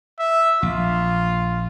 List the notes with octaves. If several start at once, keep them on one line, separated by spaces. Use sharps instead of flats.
E5
A#1 F4